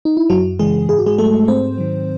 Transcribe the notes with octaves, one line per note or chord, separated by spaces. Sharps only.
D#4
E4
F#2 F#3 F#4
C#3 E3 G#3 G#4
G#2 G#4
F#4
G#3 G#4
F#3 A3 A4
G#2 C4 C5
D#3 F#3